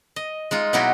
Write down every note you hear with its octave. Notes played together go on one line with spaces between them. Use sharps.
D#5
G#3 D#4 F4
B2 F#3 D#4 E4 F#4 G4